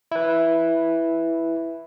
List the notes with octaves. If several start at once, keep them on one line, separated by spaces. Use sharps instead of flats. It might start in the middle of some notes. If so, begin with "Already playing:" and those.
E4 B4